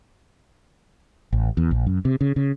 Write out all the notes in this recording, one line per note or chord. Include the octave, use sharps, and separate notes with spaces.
A1
E2
A#1
F#2
C3
C#3
C#3